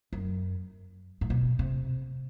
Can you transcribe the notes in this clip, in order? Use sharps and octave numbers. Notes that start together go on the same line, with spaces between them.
F#2
A2
B2
C3